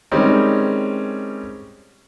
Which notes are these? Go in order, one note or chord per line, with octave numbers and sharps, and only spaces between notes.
D#3 G3 G#3 C4 C#4